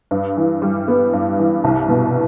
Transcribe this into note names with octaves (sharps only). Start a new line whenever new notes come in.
G2
E3
G3
B3
G2
E3
C2
B2